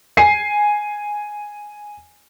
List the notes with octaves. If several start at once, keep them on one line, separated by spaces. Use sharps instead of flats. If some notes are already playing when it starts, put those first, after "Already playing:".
G#5 C7